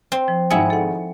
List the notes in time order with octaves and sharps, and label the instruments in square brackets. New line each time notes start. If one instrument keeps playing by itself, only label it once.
[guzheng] C4
[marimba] F3
[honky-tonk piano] G#1 G#2 C#7 [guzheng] E4 G#4 [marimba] F#5 G5 E6
[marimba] A4 F#5